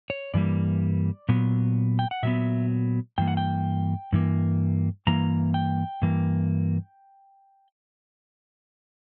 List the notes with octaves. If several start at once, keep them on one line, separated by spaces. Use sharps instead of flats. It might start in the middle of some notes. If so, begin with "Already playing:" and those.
C#5
G2 E3 G3 A#3 D5
A#2 F#3 B3
G5
F#5
A#2 F#3 B3 E5
G2 E3 A#3 G5
F#5
G5
G2 E3 A#3
G2 E3 A#3 A#5
G5
G2 E3 A#3